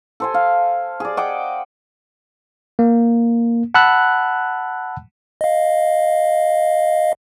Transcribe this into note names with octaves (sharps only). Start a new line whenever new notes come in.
A4 C5 G#5
F5
G#4 D5
D#5 F#5 G5 D6
A#3
F#5 A5 B5 E6 F#6
D#5 F5